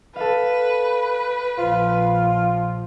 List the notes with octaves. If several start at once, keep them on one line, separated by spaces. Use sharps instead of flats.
A4 B4 F5
A#1 F3 F4